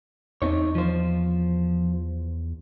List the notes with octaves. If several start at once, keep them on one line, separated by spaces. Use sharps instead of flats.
E2 C4 D#4 C#5
F3 C5